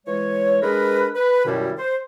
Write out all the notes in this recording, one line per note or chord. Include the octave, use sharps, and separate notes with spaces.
E3 G#3 C#5
G#3 D4 A#4 B4
B4
F#2 B2 D#3 G3 E4
C5